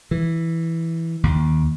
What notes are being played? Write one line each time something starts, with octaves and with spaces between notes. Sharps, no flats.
E3
D#2